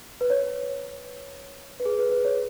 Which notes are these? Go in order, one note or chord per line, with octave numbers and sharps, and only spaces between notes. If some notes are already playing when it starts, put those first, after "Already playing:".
B4
C#5
B4
G#4
B4
B4
C#5